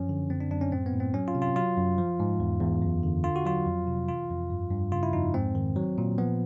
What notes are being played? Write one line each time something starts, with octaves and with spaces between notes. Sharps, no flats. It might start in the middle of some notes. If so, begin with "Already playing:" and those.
Already playing: F#2 F3 C#4
D3
F#2 C4
D4
F#2 D4
C#4
A2 C4
B3
A2
C4
F#3 C#4
F4
C3
F4
F#3 F4
F#2
F3
G#2
E2
E2
F#2
D3
D3 F4
F#4
F#3 F4
F2
C3
E3 F4
F2
G2
G2
C#3 F4
E4
F2 D#4
G#2 C4
D#3
F#3
A#2
F3 B3